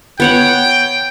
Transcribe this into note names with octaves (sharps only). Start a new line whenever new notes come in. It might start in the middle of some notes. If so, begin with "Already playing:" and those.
B3 C#5 F#5 G5